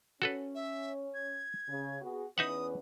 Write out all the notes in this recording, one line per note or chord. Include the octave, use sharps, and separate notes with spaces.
C#4 F#4 A4 B4
E5
G#6
C#3
B3 F#4 G#4
E2 C#4 D#4 B4 E5 F#5 D#6